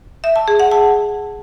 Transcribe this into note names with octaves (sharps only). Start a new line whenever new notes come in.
E5
A5
G#4
F#5
A5